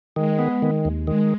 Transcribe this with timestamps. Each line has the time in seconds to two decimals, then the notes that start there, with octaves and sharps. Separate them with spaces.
0.16 D#3 G#3
0.39 B3
0.62 D#3
0.85 D#2
1.07 D#3 G#3